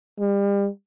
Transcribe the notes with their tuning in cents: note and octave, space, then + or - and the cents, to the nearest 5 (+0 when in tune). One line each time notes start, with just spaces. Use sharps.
G3 +35